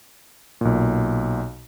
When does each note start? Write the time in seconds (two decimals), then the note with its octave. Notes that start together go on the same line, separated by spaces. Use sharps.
0.61 B1 A#2